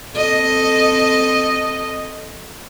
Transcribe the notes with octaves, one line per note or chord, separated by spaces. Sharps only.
C4 A4 D#5